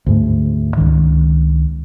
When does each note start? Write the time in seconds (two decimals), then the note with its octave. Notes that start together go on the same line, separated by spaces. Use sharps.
0.06 D2 G#2 A3
0.77 C#2 D#3